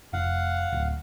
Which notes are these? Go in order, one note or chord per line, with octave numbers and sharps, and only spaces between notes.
F1 F5 F#5
D1